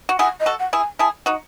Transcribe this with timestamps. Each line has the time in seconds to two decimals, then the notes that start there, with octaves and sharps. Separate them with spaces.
0.09 F#4
0.19 E4 G#4 F#5
0.40 D#5
0.46 F#4 A4
0.59 F#5
0.73 E4 G#4
0.80 G#5
0.99 E4 G#4 A5
1.26 D#4 F#4